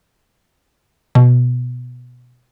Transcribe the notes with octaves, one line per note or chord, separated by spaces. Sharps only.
B2